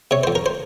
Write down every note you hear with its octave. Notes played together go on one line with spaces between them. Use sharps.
C3 C#5
C5
F2
A#4
C5